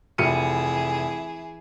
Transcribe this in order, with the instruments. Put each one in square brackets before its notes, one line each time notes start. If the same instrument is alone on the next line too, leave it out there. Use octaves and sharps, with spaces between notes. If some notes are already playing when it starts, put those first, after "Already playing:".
[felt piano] F1 C#7 D#7 [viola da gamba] E3 E4 G#4